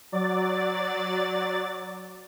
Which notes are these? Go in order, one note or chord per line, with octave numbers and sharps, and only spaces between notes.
F#3 D5 A6